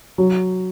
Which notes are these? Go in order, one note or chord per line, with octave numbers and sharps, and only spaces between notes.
F#3